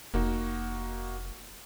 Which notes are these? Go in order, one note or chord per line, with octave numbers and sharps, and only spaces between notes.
F1 A#3 D#4 F#4